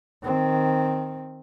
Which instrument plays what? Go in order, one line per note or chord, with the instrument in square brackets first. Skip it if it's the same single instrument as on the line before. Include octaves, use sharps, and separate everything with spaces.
[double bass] D#3 C4